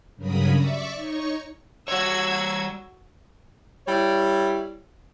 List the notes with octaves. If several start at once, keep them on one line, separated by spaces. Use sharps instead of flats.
G2 C#3 F#3 A#4 B5 D#6
D5 E5 C#6 D6
D#4 C#5 C#6
G3 F#4 C#5 E6 G#6
G3 E4 C#5